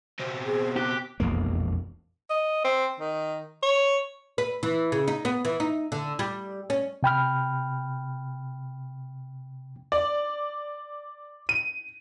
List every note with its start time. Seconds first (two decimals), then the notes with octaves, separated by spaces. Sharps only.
0.19 B2 C4
0.45 G#4 C5
0.76 G4 F#6
1.20 E1 A#1 F2 A#3
2.30 D#5
2.64 C4
3.00 D#3
3.63 C#5
4.38 B4
4.63 E3
4.92 C#3
5.08 D#4
5.25 B3
5.45 E3
5.60 D#4
5.92 D3
6.19 G3
6.70 C#4
7.03 C3 G5 B5 F6
9.92 D5
11.49 D#7